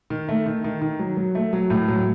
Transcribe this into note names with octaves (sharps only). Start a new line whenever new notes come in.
D#3
A3
D#3
D#3
D#3
F#3
F#3
A3
F#3
A2
F#3